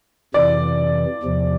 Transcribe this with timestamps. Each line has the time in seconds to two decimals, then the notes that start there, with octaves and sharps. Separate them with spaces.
0.34 F2 C3 E3 D5
1.23 E2 C3 F3